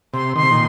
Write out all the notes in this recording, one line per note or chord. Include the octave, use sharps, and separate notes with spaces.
C3 C6
D#3 C6
C3
A#2 D#3